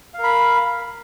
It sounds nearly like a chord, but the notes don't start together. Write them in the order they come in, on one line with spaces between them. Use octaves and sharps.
F5 A#4 B5